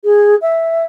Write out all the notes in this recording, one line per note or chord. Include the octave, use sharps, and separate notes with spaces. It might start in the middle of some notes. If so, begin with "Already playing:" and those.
G#4
E5